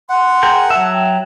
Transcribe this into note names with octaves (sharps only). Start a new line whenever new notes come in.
F#5 C6
G#4 A#4 G5
F#3 E5 A5
G5